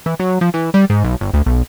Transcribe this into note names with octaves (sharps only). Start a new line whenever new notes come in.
E3
F#3
F3
E3
G3
G#2
B1
G1
D2
B1